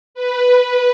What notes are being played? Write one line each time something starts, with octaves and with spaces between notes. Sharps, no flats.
B4